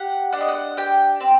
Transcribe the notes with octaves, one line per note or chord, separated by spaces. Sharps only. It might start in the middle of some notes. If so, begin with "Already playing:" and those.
Already playing: G4 F#5
D4 F#5
D#5
F#5
G4 G5
C4